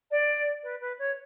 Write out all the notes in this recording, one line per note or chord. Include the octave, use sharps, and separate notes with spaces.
D5
B4
B4
C#5